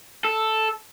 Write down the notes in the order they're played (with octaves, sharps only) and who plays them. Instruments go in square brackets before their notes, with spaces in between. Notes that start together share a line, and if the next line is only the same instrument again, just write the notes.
[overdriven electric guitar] A4